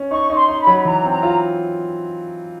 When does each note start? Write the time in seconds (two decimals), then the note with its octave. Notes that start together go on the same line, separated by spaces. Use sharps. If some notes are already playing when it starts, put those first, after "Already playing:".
Already playing: C#4
0.11 D#4 C#6
0.30 D#4
0.36 C6
0.48 D#4
0.61 B5
0.67 F#3
0.78 B5
0.85 E3 A#5
1.05 C4
1.10 A#5
1.23 F4